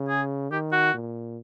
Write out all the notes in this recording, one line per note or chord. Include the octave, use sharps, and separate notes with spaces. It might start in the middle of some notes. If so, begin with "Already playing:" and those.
Already playing: C#3
G#4
D#3 G4
F#4
A#2